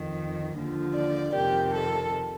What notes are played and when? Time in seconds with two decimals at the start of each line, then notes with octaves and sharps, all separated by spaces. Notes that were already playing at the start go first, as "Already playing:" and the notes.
Already playing: F2 D#3
0.56 D#2 D3 F3
0.95 D5
1.34 F2 C3 D#3 G4
1.73 A4